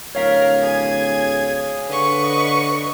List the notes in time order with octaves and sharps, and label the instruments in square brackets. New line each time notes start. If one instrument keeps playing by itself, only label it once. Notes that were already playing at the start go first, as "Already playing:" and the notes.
[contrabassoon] D1 [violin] A#4 [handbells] C#5 F5 B6
[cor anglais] G#4 [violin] G#6
[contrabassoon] D3 [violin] B4 C#6
[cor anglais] D#5